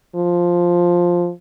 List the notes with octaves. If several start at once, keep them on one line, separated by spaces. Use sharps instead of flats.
F3